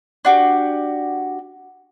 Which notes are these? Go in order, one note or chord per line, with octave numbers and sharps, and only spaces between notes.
D4 F#4 G4